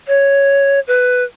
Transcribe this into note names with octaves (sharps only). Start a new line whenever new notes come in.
C#5
B4